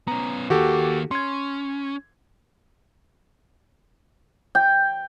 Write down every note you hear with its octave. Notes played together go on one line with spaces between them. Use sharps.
B3 C#4 A#5
D#3 A#3 F#4 G4 A4
C#4 C6 G#6
G5